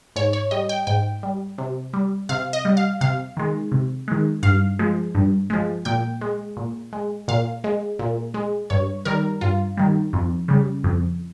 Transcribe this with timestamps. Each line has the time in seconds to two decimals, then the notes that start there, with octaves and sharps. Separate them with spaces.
0.16 G#2 C#5
0.33 C#5
0.51 G3 D#5
0.69 G5
0.87 G#2 G5
1.23 G3
1.58 C3
1.93 G3
2.29 C3 F5
2.53 D#5
2.65 G3
2.77 F5
3.01 C3 F5
3.37 D#3 G#3
3.72 C3
4.08 D#3 G#3
4.43 G2 F5
4.79 F3 G#3
5.15 G2
5.50 F3 G#3
5.85 A#2 G5
6.21 G#3
6.57 A#2
6.93 G#3
7.28 A#2 F5
7.64 G#3
7.99 A#2
8.34 G#3
8.70 G2 C#5
9.05 D#3 G3 A#4
9.41 G2 F4
9.77 D#3 G3
10.13 F2
10.48 C#3 G3
10.84 F2